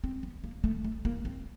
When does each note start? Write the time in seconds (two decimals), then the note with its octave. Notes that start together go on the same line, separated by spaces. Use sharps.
0.04 C4
0.23 B3
0.44 A#3
0.64 A3
0.84 A3
1.05 A#3
1.25 C4